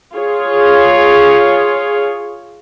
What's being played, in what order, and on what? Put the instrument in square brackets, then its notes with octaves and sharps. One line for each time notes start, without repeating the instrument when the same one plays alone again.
[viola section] F4 G#4 C#5